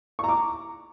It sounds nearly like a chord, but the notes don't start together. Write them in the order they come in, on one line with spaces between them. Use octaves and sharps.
C#6 A#5 D6